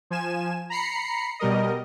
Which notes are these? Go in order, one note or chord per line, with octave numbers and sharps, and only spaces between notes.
F3 G#5 E7
A#5 B5 C7 C#7
B2 G3 A#4 D#5